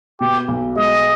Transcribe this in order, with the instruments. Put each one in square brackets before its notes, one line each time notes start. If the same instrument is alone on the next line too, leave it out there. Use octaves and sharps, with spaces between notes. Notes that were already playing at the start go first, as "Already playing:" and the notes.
[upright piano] B2 [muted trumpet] G4
[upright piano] B1
[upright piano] G#3 [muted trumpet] D#5